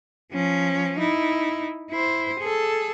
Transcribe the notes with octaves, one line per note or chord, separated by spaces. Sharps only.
F3 C#4
D#4 E4
E4 C5
G#4 A4